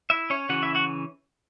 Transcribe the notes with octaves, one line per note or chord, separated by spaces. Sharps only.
E4 E5
C#4 C#5
C#3 E3 C#4 F#4 F#5
E4 E5
F#4 F#5